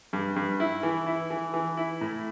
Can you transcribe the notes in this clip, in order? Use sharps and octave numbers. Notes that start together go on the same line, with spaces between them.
G2
G2
E4
E3
E4
E3
E3
E4
A2